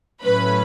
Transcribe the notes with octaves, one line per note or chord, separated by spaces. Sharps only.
A2 F#3 A3 C#4 B4 B5